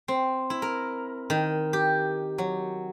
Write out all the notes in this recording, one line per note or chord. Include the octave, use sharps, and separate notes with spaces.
C4
E4
A#4
D#3
G4
F#3